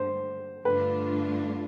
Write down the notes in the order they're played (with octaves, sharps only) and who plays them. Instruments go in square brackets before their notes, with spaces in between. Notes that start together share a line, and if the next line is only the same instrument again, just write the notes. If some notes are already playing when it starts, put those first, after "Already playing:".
Already playing: [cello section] G2 D3 G3 [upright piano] C5
[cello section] G2 D3 A3 D4 F4 [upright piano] B4